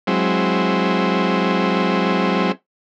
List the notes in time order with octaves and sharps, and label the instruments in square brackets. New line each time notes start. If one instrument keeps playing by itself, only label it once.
[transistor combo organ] F#3 G#3 C4 E4